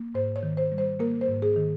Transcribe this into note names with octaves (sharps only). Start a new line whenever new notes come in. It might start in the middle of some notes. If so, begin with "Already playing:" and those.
Already playing: A#3
G#2 C5
C#5
D#3
C5
G3
C5
A#3 A#4
C5
G#2
G#4
D#3